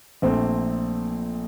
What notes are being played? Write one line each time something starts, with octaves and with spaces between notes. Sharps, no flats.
A#1 A#2 A3 C4